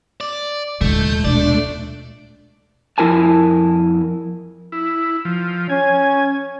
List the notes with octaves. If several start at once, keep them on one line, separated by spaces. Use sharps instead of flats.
D5
D#2 A#2 D3 E3 G#3 A3 G6
B2 A3 D4 D5
F2 E4 A#4 G#5 A5
E4
F3
C#4 G#5